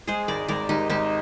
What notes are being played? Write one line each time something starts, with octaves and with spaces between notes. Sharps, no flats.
G#3 G#4 C5
G#1 A#4 D5
G#1 A#4 D5
G#1 D#4 G4
G#1 D#4 G4